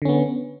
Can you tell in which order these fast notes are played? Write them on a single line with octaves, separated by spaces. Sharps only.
D3 C#4 B3